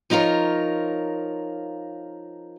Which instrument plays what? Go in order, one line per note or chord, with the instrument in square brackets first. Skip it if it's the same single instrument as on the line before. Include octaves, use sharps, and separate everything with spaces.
[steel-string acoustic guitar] F3 D#4 F4 A#4 C#5